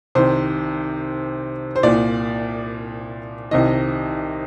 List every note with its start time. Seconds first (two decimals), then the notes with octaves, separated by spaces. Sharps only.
0.15 C2 C3 D#3 C5
1.76 C5
1.83 C2 A#2 D5
3.51 C2 C3 D#3 D#5